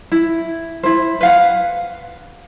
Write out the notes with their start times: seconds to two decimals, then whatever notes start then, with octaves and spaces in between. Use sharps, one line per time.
0.12 E4
0.83 E4 C5
1.21 B4 F5 F#5